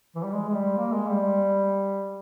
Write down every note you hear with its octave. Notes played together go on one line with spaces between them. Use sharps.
E3
G3
G#3
G#3
G3
A#3
G#3
G3